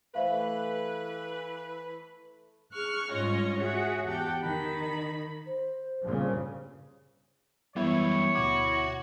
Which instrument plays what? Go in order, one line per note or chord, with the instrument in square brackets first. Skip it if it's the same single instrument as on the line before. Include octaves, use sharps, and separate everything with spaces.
[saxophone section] E3 B4 [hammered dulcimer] A3 [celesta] C5 E5 F5
[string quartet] G#4 C#6 F6 F#6
G#2 G3 C#4 F4 C#5 D#5
F#4 G#4 C#5 E5 F#5
E2 G4 F#5 G5 A5
D#3 B5
[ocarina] C5
[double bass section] G2 A#2 C#3
[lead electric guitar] F#2 G3 [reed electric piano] E3 B3 [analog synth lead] E4 [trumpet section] C#5
[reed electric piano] D2 B2 D6 [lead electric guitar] F#4